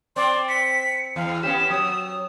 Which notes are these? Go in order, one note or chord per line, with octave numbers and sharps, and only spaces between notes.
C4 D5 C6
B6 C#7
E2 F5
B3 C#4 G4 E7
F#3 D#6